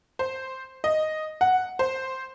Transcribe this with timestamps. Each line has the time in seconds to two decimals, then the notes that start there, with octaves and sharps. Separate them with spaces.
0.19 C5
0.84 D#5
1.41 F#5
1.79 C5